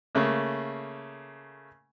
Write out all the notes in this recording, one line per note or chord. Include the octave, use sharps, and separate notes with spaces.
C#3 A3 A#3